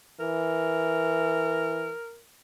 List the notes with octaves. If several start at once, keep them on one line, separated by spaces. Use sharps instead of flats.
E3 A#4